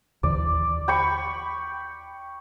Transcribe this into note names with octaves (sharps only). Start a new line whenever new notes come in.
D#2 D3 E3 D5
G5 B5 C#6